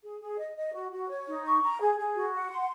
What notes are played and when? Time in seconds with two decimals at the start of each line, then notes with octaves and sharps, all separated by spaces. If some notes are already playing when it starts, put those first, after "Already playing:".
0.04 G#4
0.21 G#4
0.39 D#5
0.56 D#5
0.75 F#4
0.92 F#4
1.10 C#5
1.27 D#4
1.45 C#6
1.62 A#5
1.80 G#4
1.98 G#4
2.16 F#4
2.33 F#5
2.50 C6